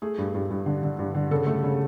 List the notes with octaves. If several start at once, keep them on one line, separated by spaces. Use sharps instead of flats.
A3 G#4
G2
G2
G2
D3
D3
G2
D3
C#3 A4
A3
C#3